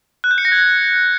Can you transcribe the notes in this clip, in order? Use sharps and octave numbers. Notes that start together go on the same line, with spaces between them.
F#6
G6
C#7
A#6
G#6